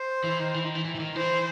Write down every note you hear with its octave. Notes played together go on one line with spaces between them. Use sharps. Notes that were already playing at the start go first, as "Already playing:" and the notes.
Already playing: C5
E3
D#3
E3
D#3
E3
E3
E3
D#3
E3 C5